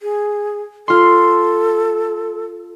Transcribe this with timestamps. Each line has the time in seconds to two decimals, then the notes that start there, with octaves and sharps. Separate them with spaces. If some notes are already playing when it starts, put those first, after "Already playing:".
0.02 G#4
0.88 F4 A4 C6